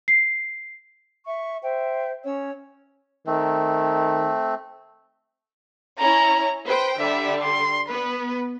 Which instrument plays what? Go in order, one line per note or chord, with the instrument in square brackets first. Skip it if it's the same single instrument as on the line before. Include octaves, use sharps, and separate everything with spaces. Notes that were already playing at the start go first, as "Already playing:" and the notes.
[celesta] C7
[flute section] E5 C#6
C5 E5 G5
C#4 C#5 E6
[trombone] D#3 [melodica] A3 C4
[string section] C#4 E4 [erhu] A#5
[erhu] B4 [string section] C5 G5
[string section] D3 G3 [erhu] E5
[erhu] C6
[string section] B3 [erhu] B4